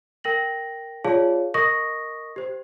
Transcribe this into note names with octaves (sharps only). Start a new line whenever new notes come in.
A#4 G5 A#6 F#7
F4 G#4 C#5 D5 F5 A5
A#4 D#5 C#6 D#6 A#6
G4 C5